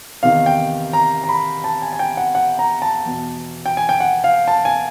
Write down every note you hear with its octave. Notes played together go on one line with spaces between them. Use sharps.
E2 C3 D#3 F5
G5
A#5
A#5
B5
A5
G#5
G#5
G5
F#5
F#5
A#5
A5
E2 B2
G5
G#5
G5
F#5
F5
A5
G#5